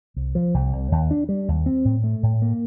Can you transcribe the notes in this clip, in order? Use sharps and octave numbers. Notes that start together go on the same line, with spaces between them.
C2
F3
C2
C2
D#2
D4
G3
D#2
C4
A2
A3
A2
A#3